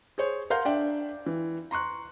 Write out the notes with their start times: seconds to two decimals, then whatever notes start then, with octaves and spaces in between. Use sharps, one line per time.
0.18 G#4 C5 C#5
0.50 A#4 F5 F#5 C6 G6
0.65 D4 D5 E5 G5
1.26 E3
1.71 A#5 C6 C#6 F#6